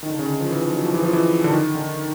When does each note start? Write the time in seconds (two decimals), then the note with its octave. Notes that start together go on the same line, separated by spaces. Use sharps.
0.03 D#3
0.10 D3
0.19 C#3
0.27 D3
0.40 F3
0.51 E3
0.63 F3
0.76 F#3
0.85 F3
0.94 E3
1.03 F3
1.13 E3
1.44 D3
1.50 D#3
1.75 D3